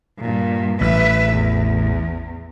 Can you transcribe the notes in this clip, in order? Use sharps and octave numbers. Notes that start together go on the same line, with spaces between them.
G2 A#2
A1 B4 E5
E2